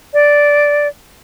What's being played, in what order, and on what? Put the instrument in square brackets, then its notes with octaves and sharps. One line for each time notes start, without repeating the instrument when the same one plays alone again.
[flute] D5